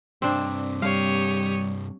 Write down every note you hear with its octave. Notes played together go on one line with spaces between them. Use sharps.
C2 G2 C4 D4
G3 G4 C#5 F5 D#6